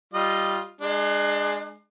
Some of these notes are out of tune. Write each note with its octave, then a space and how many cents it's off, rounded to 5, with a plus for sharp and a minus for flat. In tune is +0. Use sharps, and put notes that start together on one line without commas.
G3 -10 F4 +0 D#5 +0
G#3 +0 D4 +35